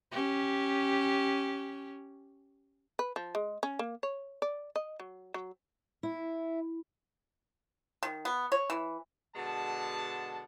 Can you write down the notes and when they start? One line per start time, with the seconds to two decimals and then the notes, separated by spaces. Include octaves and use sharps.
0.12 C#4 G4
2.99 B4
3.16 F3
3.35 G#3
3.63 C#4
3.79 A#3
4.03 C#5
4.42 D5
4.76 D#5
5.00 F#3
5.34 F#3
6.03 E4
8.03 D#3
8.25 B3
8.52 C#5
8.70 E3
9.36 B2 D3 G#3 A5